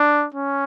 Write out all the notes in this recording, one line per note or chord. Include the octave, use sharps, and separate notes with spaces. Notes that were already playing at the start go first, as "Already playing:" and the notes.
Already playing: D4
C#4